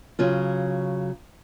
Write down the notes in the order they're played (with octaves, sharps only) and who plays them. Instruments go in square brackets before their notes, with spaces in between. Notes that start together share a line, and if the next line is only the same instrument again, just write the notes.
[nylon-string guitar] C#3 F#3 F4